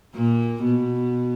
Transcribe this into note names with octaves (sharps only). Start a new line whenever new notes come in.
A#2 A#3
B2 B3